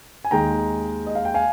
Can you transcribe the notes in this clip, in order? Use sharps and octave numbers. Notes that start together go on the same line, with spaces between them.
G#5
D#2 D#3 G#3 G5 A#5
D#5
F5
G5
F5 G#5